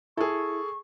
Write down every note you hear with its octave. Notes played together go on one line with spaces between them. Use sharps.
E4 G#4 A4 C#6